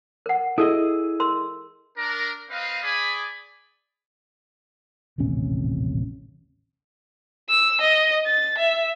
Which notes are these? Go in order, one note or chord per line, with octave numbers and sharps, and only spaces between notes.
A#4 F#5
E4 G#4 A4 D#5
A#4 C6 E6
D4 A#4
C4 B4 D#5 F5
G#4 D5 G#5 B5 D#6
D#1 A1 C3 C#4
E6
D#5
A6
E5